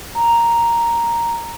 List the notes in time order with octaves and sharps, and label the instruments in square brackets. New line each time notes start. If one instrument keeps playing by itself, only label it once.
[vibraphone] A#5